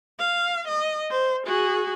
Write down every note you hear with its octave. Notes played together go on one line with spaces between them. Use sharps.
F5
D#5
C5
F#4 G#4